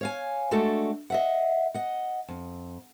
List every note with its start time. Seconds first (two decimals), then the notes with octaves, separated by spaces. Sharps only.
0.01 C#5 F5 G#5
0.51 G#3 A3 D4 F#4 A4
1.10 D#5 E5 F#5
1.74 D#5 F#5
2.28 F2